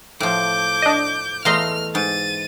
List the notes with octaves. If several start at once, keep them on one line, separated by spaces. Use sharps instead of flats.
A2 F3 D6 G6
D4 D#5
E2 A3 D#5 F5 A#5 C6 F6
G#2 A6 D#7